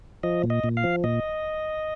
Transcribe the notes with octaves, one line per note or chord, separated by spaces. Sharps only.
F3 D#5
A#2
D#5
A#2
F5
F3
A#2 D#5